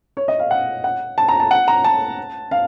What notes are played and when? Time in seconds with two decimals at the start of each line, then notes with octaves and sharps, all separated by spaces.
0.17 C#5
0.28 D#5
0.39 F5
0.51 F#5
0.84 F#5
1.18 A5
1.29 A#5
1.40 A5
1.51 F#5
1.68 A#5
1.84 A5
2.51 F5